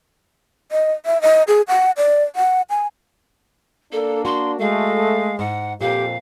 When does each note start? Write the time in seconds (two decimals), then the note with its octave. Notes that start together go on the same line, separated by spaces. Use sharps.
0.72 D#5
1.06 E5
1.22 D#5
1.48 G#4
1.68 F#5
1.97 D5
2.36 F#5
2.70 G#5
3.92 A#3 D4 A4
4.25 F#4 C6
4.59 G#3 A3 F5
5.39 G#2 F#5
5.81 F2 A#2 G4 F5